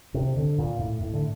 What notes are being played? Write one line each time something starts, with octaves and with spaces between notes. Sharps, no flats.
C3
D3
A#2
A2
A2
D3